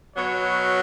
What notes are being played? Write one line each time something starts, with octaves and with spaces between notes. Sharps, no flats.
B2 F#3 C#5